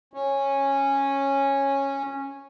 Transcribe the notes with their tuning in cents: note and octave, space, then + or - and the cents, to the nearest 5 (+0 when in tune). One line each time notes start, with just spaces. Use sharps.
C#4 -10